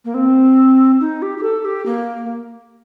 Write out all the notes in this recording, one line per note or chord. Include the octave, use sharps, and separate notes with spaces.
A#3
C4
D#4
G4
G4
A4
G4
A#3